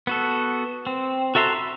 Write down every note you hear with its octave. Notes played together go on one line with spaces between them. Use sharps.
B3 F#4 A4
C4
F#4 A4 E5 A#5 C6
B5